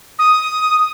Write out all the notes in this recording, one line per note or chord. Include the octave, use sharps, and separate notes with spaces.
D#6